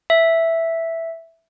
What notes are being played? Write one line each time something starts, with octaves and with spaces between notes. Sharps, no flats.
E5